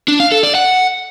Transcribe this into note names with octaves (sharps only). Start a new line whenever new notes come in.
D4
F5
A4
D5
F#5